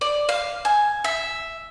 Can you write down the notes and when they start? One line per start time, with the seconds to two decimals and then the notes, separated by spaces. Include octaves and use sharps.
0.01 D5
0.29 F5
0.65 G#5
1.04 E5